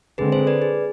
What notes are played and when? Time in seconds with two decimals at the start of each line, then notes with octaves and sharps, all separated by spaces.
0.18 D3 G#3 C4 G#4 B4
0.32 A4 C5
0.47 B4 D5
0.62 G#4